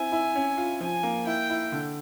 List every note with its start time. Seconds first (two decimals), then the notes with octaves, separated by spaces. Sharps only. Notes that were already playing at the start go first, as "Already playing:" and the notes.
Already playing: C4 E4 G#5
0.12 E4
0.35 C#4
0.58 F4
0.80 F3 G#5
1.03 A#3
1.26 E4 G5
1.50 E4
1.72 D3